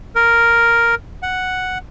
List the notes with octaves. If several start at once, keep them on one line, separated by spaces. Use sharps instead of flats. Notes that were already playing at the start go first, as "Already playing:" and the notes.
A#4
F#5